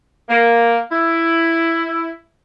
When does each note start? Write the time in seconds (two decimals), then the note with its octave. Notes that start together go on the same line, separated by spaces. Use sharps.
0.29 A#3
0.92 E4